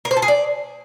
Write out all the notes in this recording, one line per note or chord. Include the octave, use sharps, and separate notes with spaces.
A#4
C5
A4
G#4
D5